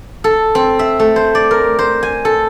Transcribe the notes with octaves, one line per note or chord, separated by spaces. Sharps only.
A4
C4
E5
A3
C5
D5
A#4
C5
G#5
A4